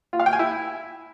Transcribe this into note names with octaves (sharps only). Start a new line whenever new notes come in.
F4
F5
G5
G#5
E4